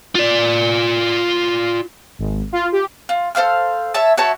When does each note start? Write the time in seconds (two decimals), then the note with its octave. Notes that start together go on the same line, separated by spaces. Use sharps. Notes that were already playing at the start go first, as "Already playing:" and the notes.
0.15 F4 D5
2.19 G#1
2.53 F4
2.72 G4
3.09 F4
3.35 A4 C5 F5 F6
3.94 C#5 E5 A5
4.17 F#4 C#5 E5 A5